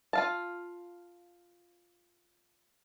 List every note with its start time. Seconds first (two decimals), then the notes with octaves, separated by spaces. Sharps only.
0.13 F4 F5 A5